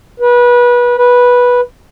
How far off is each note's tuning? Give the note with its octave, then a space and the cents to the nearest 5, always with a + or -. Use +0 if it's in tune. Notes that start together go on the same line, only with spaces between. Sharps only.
B4 -25
B4 -10